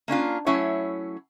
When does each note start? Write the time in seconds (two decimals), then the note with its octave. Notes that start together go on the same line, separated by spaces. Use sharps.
0.08 A#3 C#4 D4 F4
0.46 F#3 A3 C#4 E4 C#5